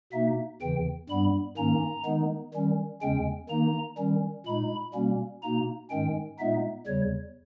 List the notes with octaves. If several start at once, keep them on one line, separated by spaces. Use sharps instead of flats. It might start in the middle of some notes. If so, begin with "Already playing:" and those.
B2 A#3 D#4 E5
E2 C#3 E3 G5
G2 G3 B3 B5
G#2 D#3 A#3 C#4 A#5
D#3 G#3 B3 D#4
D#3 G3 C#4
E2 C#3 G#3 C#4 G5
D#3 A#3 D#4 A#5
D#3 G3 C#4
A#2 G#3 D#4 B5
B2 G3 A#3 C#4
B2 A#3 D#4 A#5
G#2 D#3 G#3 C#4 G5
A#2 G#3 B3 D#4 E5
E2 C#3 G3 C#5